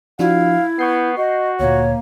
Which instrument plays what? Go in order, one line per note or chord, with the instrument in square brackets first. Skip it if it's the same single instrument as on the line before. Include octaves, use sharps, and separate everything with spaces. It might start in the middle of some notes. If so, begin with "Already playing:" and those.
[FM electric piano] F3 D4 F#4 [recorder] E4 [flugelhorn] F5
[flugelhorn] B3 [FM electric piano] C#6 G6 C7
[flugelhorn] F#4 [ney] D#5
[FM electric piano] D2 A#2 [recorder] A#3 [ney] C#5